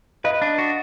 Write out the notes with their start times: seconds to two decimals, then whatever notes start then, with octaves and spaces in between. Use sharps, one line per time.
0.24 B4 D#5 F5
0.42 D4
0.58 F#4